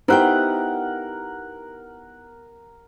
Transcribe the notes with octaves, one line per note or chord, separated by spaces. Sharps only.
B3 D#4 E4 G4 A#4 C5 F#5 G5